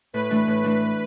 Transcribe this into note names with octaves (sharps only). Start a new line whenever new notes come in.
A2 B4
E3 A3 D4
A2
E3 A3 D4